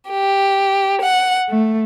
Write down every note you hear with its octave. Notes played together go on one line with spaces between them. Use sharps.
G4
F#5
A3